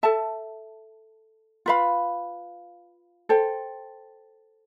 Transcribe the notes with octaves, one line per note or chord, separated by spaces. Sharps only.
A4 E5 A5
F4 B4 F5 B5
A4 C5 G5